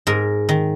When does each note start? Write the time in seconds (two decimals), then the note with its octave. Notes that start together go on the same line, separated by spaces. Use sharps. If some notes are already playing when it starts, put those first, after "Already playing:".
0.07 G#2 A#4
0.49 D#3